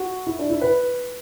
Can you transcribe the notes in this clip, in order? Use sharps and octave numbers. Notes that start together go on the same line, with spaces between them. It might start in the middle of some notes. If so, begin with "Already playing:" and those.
Already playing: F#4
E4
D4
E4
B4